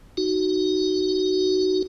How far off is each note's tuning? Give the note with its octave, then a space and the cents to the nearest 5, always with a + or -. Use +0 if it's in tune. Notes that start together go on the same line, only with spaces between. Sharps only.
D#4 +0 F#4 +15